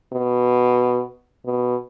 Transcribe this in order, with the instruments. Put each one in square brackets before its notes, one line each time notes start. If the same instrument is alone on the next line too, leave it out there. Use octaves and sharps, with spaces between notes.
[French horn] B2
B2